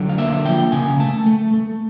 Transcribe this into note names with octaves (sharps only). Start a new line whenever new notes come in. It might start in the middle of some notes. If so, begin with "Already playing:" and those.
Already playing: D3 F#3
F5
A#3 E5
F3 G5
C#3 G#5
A3 A5
A3
A3